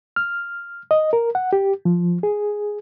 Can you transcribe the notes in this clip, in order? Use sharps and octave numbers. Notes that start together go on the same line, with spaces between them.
F6
D#5
A#4
F#5
G4
F3
G#4